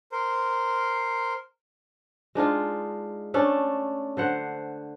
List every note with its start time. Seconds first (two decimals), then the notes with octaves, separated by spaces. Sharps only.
0.12 A#4 C5
2.35 G#3 D4 D#4 F4
3.34 A3 C#4 D4 A4
4.17 D3 C5 F#5